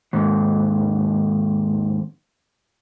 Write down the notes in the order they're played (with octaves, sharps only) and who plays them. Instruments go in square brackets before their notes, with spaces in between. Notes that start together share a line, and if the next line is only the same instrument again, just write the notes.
[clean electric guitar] D#2 G#2